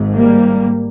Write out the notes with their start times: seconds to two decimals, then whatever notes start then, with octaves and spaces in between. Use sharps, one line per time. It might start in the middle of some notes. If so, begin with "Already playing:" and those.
Already playing: G#1 G#2
0.16 G3 A#3